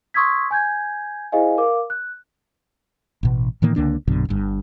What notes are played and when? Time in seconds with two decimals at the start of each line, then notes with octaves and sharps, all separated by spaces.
0.14 C6 C#6 D#6 E6 G#6 B6
0.51 G#5 G6 G#6
1.32 E4 G#4 C5 D#5 F5 G#5
1.58 A#4 F5 D6
1.90 F#6
3.23 A1 B2
3.62 A2 D#3 E3 A#3
3.76 C#2 D3 A#3 D4
4.08 A#1 F#2 B2 D3
4.29 G1 G2